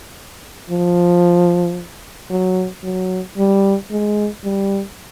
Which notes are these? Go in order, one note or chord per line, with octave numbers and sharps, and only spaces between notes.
F3
F#3
F#3
G3
G#3
G3